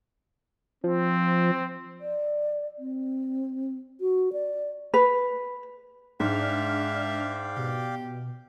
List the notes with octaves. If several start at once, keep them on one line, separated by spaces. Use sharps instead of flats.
F3 C4
D5
C4
F#4
D5
B4
G#2 G#3 D4 D5 E5 F5 G5 F6
B2 G4